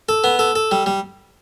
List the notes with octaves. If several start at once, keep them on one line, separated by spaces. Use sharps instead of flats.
A4
B3
A4
A4
G3
G3